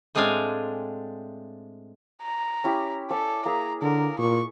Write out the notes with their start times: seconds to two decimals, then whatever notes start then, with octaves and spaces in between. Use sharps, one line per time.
0.15 A2 G#3 C4 D4 F5 G#5
2.22 A#5
2.64 C#4 E4 G4
3.11 A4 C#5 D5 G#5
3.45 A#3 G#4 E5 A#5
3.82 D3 A#4
4.19 A#2 C#6